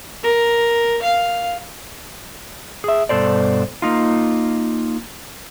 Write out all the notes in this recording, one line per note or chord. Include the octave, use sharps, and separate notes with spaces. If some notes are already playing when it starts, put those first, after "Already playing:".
A#4
F5
G#4 E5
G2 B2 A4 C5 D5
A#3 D#4 F4